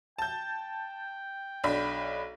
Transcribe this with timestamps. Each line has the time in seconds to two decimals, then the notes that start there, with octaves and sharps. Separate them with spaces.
0.18 G5 A5 G6
1.64 B1 D4 B5